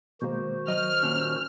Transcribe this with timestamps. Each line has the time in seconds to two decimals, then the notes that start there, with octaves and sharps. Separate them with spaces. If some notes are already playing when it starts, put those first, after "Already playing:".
0.22 B2 D#3 G#3 A#3 F#4 C5
0.68 F#3 D#5 F6
1.03 D#2 A#2 C#4